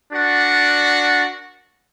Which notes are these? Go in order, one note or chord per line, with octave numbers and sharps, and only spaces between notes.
D4 F#4 A#4 D5 F#5